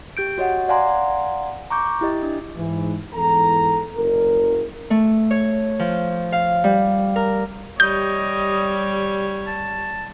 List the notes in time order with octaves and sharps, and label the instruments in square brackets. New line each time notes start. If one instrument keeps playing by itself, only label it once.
[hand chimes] G4 G6 D7
F#4 C#5 D#5 F#5
D5 F5 F#5 G#5 A#5 C6
A#5 C#6 D6 G6
E4 G4 D#5
D4
[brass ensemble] G#2 E3
E2 G#2 E3 A4 A#5
F#1 A#4
[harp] A3
C#5
F3
F5
G3
A#4
[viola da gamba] G3 [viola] G4 C#5 [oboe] D#5 [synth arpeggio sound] G6
[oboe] A5